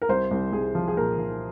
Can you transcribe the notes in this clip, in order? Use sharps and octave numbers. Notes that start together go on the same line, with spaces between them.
A#4
C2 C5
C2
C2 G#4
F3
G#4
A#2 A#4
F3